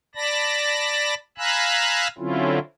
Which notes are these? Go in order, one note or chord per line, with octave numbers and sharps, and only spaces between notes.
D5 A5 B5 A#6
F5 G#5 A#5 B5 E6 F#6
D3 F#3 C4 C#4 E4 F4